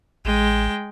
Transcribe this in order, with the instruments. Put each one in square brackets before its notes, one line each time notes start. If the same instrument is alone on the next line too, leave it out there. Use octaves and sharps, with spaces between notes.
[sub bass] A1 [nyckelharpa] G#3 G5